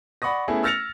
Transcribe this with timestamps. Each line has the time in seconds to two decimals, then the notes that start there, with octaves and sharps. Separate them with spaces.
0.22 D5 F#5 B5 C#6 D#6 A#6
0.48 A3 B3 C#4 E4 G#4
0.63 E6 F6 A6 A#6 C#7 F7